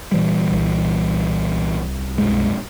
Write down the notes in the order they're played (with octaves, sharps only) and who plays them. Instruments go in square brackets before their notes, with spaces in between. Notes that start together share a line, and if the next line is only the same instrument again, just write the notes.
[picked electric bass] A#2 E3 G3
[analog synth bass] C2
[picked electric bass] B1 F#2 G#3